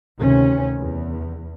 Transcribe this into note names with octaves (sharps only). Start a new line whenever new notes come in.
D2 C3 D#3 C#4
E2